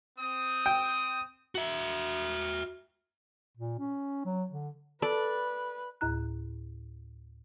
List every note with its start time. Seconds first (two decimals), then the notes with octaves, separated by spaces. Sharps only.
0.19 C4 D#6
0.66 G5
1.55 F#4 E5
3.57 A#2
3.79 C#4
4.26 F#3
4.51 D3
5.02 A4 B4 D5
6.01 D2 A2 E4 A#5 F#6